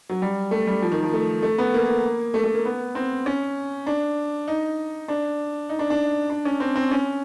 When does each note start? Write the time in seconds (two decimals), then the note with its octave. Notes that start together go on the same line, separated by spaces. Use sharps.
0.09 F#3
0.22 G3
0.51 A3
0.67 G3
0.82 F3
0.92 D#3
1.03 F3
1.13 A3
1.42 A3
1.58 B3
1.74 A#3
2.34 A3
2.44 A3
2.54 A#3
2.65 B3
2.95 C4
3.26 C#4
3.86 D4
4.48 D#4
5.08 D4
5.69 D#4
5.79 D4
5.90 D4
6.30 D4
6.45 C#4
6.60 C4
6.76 C4
6.91 C#4